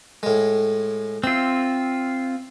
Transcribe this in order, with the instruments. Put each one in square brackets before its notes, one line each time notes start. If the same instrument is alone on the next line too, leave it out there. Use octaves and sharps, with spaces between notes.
[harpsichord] A2 G#3
[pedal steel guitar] C4 F4 [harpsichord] E5